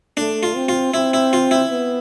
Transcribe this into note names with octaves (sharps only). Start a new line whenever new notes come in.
A3 D4
F4
C4
F4
C4 E4
E4
F4
E4
B3